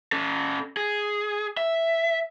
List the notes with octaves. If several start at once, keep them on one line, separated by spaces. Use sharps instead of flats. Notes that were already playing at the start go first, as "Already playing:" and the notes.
C#4 A4
G#4
E5